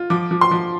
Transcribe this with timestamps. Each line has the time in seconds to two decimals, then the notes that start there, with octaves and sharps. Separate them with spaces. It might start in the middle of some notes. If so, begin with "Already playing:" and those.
Already playing: F4
0.10 F3 D6
0.31 F3
0.41 C6
0.51 F3